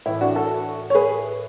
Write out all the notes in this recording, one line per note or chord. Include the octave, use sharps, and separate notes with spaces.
A2 E3 E4
D4 F#4
F#4 A4
C#5
G#4 B4